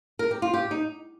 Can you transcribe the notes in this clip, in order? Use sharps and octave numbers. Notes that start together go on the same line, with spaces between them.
A#4
G4
F4
G4
D#4